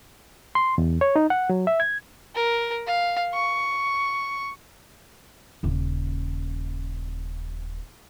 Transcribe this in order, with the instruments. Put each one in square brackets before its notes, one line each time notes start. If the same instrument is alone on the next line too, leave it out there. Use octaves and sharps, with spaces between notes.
[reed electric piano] C6
E2
C#5
D#4
F#5
F#3
E5
G#6
[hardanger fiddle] A#4
F5
C#6
[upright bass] D#1 C#3